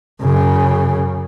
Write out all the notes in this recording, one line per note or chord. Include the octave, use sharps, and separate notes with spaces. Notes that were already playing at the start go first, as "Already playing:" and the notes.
F#2 C#3